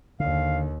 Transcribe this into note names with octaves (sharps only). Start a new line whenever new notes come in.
D#2 D3 F5